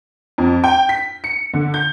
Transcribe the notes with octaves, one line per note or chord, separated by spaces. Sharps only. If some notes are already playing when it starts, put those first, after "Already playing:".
F2
G5
B6
C#7
D3
G6